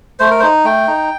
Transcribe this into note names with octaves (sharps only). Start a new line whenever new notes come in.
A3 C5
A#4
C5
D#4
A3 G5
D#4